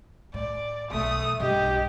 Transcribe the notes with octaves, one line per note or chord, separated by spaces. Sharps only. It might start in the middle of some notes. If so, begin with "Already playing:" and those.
A2 D5
B1 E2 A3 D#6
B1 G2 G4 D#5